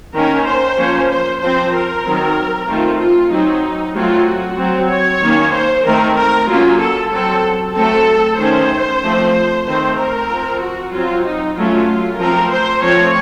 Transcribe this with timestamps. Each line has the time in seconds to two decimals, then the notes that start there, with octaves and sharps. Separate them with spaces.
0.14 D#3 A#3 C#4 A#4
0.46 C5
0.77 F3 A#3 C#4
1.09 C5
1.41 F3 C4 C5
1.73 A#4
2.05 D#3 F#3 C4
2.68 D#3 A3 C4 F4
3.00 F4
3.31 F#3 C4 D#4
3.94 F#3 A3 C4 F4
4.27 F#4
4.57 F#3 C4
4.89 C#5
5.21 D#3 A#3 C#4
5.53 C5
5.84 D#3 A3 C4 A#4
6.16 A#4
6.48 F#3 A#3 C#4 F4
6.79 A4
7.12 F#3 C4 A4
7.74 F#3 A3 C4 A4
8.38 D#3 A3 C#4 C5
9.02 F3 A3 C4
9.65 D#3 A3 C4 C5
9.97 A#4
10.28 F3 C4
10.60 F#4
10.93 F#3 C4 F4
11.24 D#4
11.56 F#3 A3 C#4 F4
12.19 F3 A3 C4 A#4
12.51 C5
12.82 F3 A3 C4 C#5